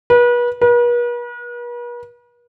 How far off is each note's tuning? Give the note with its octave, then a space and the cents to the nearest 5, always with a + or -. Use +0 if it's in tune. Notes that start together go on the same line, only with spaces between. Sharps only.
B4 -35
B4 -45